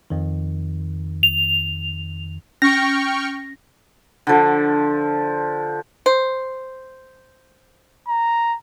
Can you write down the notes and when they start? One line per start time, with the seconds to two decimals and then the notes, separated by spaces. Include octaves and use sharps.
0.10 F2 D#3
1.23 F7
2.62 C#4 G5 C#6 F6 A#6
4.27 D3 F3
6.06 C5
8.08 A#5